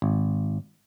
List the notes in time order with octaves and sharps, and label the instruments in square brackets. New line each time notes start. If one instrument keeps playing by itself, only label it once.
[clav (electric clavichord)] G#1